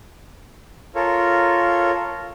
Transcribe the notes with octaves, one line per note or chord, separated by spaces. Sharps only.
F4 A4 A#4 C#5